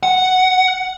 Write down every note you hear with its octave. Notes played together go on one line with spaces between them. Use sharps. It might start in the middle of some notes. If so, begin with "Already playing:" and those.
F#5